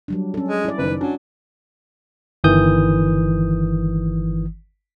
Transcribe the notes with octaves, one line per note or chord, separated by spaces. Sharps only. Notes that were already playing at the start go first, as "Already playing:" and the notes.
F#3 G3 D4
C#4 A4
G#3
E4 D5
F#1 D#3 B4
F#3 C#4 D4
G1 D#3 E3 D#6 G6